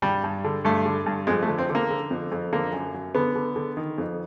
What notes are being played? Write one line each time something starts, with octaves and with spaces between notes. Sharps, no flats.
G2 G3
G2
D3
G2 A3
D3
G2
F2 G#3
A3
D3
C4
D3
A#3
D3
F2
F2
D3 A#3
F#2
F#2
D3 B3
D3
D3
D#3
F2